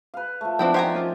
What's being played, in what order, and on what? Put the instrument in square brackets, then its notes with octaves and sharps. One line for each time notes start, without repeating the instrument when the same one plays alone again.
[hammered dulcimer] B4 F5
F3 A3
[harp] F3 [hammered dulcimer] B3 D4 [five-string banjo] C4 E4 G5
[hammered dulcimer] D#3 C4 D5 [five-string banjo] G4 G#5 A#5 [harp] C5
[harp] C#4 F4